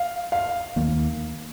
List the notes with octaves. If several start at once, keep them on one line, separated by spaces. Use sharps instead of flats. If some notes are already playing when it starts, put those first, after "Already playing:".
Already playing: F5
F5
D#2 D#3 A#3